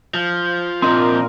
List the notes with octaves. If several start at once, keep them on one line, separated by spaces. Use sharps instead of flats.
F3
A#2 C4 D4 A#4 D#5 C6